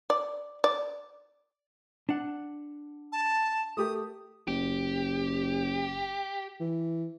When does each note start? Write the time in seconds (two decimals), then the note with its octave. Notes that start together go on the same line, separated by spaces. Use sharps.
0.10 D5
0.64 D5
2.09 D4 F#5
3.12 A5
3.77 A3 G4 A#4 D#6
4.48 F#1 G4
6.60 E3